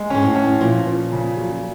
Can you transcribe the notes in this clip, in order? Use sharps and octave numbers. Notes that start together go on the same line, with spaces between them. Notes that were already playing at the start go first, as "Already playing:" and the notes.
Already playing: G#3
G#2 C#4
A2
C#4
A#2 F3
F3
C#3
F#3